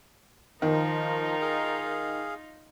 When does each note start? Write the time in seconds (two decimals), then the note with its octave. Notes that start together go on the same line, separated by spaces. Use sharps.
0.62 D#3 F3 D#4 F4 A#4
1.41 G#4 F5